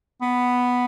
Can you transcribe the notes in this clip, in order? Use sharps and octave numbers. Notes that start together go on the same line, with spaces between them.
B3